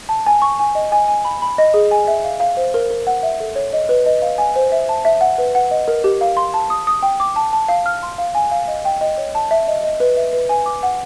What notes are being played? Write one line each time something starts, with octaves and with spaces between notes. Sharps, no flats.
A5
G#5
C#6
G#5
D#5
G#5
G#5
B5
B5
D#5
G#4
G#5
E5
F5
F5
C5
A#4
A#4
F#5
E5
A4
C#5
D#5
B4
D#5
F5
G#5
C5
E5
A5
E5
F#5
B4
F#5
D#5
A#4
G4
F5
C6
A5
D#6
D#6
G5
D6
A5
A5
F5
F6
C6
F5
G#5
F5
D#5
G5
D#5
C#5
A5
E5
D#5
D#5
B4
E5
B4
G#5
D6
F#5